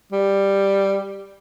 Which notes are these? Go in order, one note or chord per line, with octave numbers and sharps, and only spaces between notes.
G3